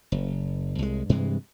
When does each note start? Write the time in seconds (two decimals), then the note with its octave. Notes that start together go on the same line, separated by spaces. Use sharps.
0.12 F#1
0.79 C2 G#3
1.09 G2 C3 E3 G#3